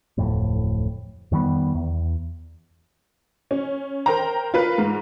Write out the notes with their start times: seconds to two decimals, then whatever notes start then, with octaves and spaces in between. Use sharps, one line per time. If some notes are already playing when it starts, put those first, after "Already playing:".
0.18 D1 F2 A2
1.31 F2 D#3 G3 B3
1.75 E2
3.51 C#4
4.06 A#4 C5 G5 A#5
4.54 F4 A#4 B4
4.78 G#2